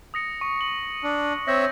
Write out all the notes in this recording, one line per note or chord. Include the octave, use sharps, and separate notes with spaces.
D#6 A#6 C#7
C#6
F#7
D4
C4 C#5 E5 G6 A#6